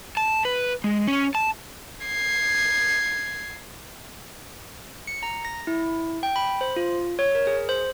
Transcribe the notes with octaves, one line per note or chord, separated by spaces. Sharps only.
A5
B4
G#3
C#4
A5
G#6 C7
C#7
A#5
A#6
E4
G5
B5
C5
F4
C#5
A#4
G#4
C5